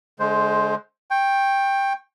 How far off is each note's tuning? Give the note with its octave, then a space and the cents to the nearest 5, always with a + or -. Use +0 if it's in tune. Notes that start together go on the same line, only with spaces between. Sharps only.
D3 -20 G#3 +25 C5 +0
G5 +10 C#6 -30